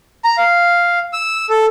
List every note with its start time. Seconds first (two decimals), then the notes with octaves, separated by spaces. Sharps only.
0.25 A#5
0.38 F5
1.13 E6
1.49 A4